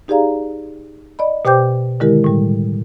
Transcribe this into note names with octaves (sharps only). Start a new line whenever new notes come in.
D#4 G4 G#4 D5 F5 A#5
D5 D#5 B5
B2 G4 C5 G5 D6 G6
D3 D#3 G#3 E4 G4 A#4
A2 G3